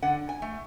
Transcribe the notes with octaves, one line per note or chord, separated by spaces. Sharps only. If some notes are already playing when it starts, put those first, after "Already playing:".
D3 F#5
G#5
A3